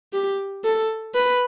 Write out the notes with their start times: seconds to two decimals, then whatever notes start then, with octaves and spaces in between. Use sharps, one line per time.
0.13 G4
0.64 A4
1.15 B4